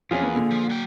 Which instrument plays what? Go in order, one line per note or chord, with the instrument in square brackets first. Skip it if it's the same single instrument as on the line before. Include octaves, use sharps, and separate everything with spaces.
[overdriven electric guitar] E2 [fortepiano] F3 C4 C#4 [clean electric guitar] F4 G#4
[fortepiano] A#3 B4
[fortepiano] A#2 D3 [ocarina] A#3
[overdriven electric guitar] F3
F#3 G5